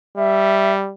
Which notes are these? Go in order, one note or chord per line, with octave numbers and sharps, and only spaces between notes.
G3 E5